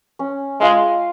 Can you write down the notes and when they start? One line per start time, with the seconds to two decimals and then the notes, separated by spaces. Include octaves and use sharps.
0.19 C#4
0.60 G#3 F4 C5 F5